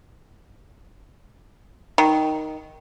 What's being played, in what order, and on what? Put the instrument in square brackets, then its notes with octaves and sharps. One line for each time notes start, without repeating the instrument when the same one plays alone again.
[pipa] D#3